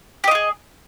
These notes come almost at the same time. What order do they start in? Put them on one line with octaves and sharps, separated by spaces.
G4 D#5 F4 G#4